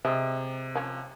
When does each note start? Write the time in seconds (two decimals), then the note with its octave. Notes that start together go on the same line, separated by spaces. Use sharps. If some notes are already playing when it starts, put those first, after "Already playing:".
0.05 C3 G#3 E5
0.75 F3 C#4